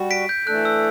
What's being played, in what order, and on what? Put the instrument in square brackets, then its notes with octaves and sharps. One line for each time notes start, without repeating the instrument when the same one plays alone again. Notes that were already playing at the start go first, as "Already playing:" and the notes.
Already playing: [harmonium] G3 F#4
[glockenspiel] B6 D7
G6
[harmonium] E3 A3 D4 A4 [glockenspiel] F#6
[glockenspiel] E6